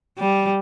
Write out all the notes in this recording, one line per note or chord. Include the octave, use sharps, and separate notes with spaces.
G3